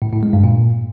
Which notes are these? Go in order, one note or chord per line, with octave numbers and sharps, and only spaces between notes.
A2
A2
G#3
G2
A#2